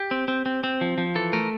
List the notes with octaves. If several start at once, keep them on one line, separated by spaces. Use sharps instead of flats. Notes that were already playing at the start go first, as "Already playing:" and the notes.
Already playing: G4
C4
C4
C4
C4
F3
F3
E3 A4
A3 A#4